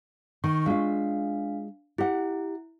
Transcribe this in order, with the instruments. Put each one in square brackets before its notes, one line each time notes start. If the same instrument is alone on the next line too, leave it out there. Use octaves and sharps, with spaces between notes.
[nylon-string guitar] D#3 [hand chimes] C#6
[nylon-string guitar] G#3 F4 [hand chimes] D4 F5
[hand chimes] E4 [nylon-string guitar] G4 F#5